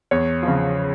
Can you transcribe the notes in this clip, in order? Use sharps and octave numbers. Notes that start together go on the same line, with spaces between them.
E2 C#5
C#3 F3